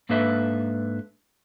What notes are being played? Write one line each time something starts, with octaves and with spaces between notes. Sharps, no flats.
G#2 A#3 D4 A4 B4 E5